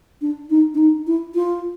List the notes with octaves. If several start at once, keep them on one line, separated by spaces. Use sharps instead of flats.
D4
D#4
D4
D#4
E4
F4